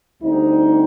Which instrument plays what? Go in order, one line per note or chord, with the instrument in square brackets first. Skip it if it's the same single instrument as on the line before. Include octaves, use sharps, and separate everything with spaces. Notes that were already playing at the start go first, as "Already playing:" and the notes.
[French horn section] D2 C3 G3 C4 D#4